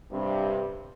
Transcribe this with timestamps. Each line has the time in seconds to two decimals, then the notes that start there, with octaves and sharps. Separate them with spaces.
0.13 G2 C3